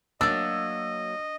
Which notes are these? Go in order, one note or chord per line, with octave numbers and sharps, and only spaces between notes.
F#3 A#3 D4 D#5 E6